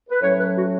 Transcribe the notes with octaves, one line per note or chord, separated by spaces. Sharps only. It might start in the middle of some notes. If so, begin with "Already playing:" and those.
B4
A2 F#3 C#4 C#5
B4
F#4